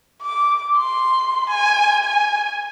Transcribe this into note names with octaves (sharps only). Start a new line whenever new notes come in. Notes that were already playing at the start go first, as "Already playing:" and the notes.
D6
C6
G#5
G#5